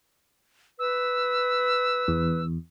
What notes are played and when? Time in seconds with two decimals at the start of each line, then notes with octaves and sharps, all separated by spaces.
0.79 B4 E6
2.08 E2